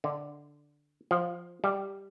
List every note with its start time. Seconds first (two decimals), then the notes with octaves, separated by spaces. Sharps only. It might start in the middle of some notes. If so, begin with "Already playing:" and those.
0.04 D3
1.11 F3
1.64 G3